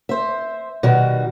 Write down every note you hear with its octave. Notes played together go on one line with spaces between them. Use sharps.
C5 E5
B2 D#3 G3 F#4